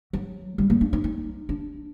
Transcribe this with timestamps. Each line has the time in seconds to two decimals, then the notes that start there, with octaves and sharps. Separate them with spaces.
0.13 F#3
0.58 G3
0.70 A#3
0.81 D4
0.93 D#4
1.04 D#4
1.49 D4